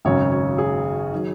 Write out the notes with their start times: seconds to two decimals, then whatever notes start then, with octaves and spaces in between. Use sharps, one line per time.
0.05 G#1 F#2 C#3 C#5
0.31 C#5
0.58 G#4
1.13 D#3 F#3